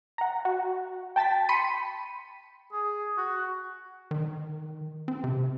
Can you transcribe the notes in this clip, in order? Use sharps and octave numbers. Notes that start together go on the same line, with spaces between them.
F#5 A#5
F#4
G5 A5 A6 B6
B5 C6 B6 C#7 D#7
G#4
F#4
D#3
C4
C3